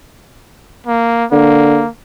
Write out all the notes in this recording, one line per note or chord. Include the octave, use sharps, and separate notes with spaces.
A#3
D3 A#3